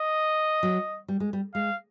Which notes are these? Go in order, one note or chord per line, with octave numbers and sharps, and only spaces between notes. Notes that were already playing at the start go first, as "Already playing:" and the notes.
Already playing: D#5
F#3
G3
G#3
G3
G#3 F5